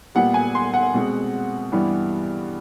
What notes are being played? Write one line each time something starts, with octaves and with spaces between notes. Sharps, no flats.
A#2 G3 B3 F#5
G#5
C6
F#5
B2 G#3 C4
G2 E3 G3 B3